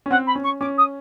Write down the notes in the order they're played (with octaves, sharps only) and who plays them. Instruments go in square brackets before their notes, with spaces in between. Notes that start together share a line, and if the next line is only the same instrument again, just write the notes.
[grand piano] C#4
[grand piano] C4 [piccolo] F#5
[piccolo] B5
[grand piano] C#4
[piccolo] C#6
[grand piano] C#4 [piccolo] D6
[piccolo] D#6